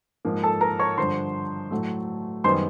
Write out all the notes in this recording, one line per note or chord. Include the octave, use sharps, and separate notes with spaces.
G#2 F3 A#3
A4 A5
A#4 A#5
C#5 C#6
G2 D3 F3 C5 C6
A2 F#3 A3
F#2 D#3 G3 B3 C5 C6